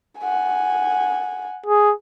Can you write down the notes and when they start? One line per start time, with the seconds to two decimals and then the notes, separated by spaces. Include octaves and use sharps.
0.19 F#5 G#5
1.66 G#4